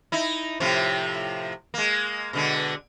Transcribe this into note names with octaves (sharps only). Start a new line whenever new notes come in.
D#4 E4
A2 C3 F3
G#3 A#3
B2 D3 G#3